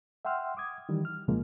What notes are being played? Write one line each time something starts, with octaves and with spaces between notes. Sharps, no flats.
E5 F#5 G5 C6 E6 F6
D6 D#6 G#6
D#3 E3 G3
F6
C2 A#2 C#3 F3 G#3 A#3